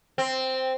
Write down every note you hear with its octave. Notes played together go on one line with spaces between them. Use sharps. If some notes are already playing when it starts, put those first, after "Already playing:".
C4